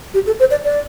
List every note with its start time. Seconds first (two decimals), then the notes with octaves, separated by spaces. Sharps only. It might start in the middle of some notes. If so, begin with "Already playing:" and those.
0.14 G4
0.26 A4
0.39 C5
0.51 D5
0.64 D5